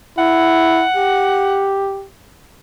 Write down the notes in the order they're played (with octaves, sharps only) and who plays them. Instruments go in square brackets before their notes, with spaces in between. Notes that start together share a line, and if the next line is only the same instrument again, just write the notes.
[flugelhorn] E4 [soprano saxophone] F#5
[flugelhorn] G4